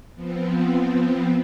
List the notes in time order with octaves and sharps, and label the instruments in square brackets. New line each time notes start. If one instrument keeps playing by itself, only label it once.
[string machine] F3 B3 C4